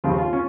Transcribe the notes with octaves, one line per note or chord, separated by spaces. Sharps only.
D#2 C#3 F3 F4
F4
C#4